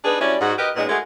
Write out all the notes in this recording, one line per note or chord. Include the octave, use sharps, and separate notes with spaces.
D4 D#4 G#4 B4
F#3 G3 C#4 E4 D5
G#2 F#4
G4 A#4 B4 D#5
A#2 G#3 B3 C#4 D#4
G#3 A3 F#4 G#4 A#4